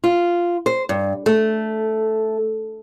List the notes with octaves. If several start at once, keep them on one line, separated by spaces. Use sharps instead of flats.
F4
C5
G2
A3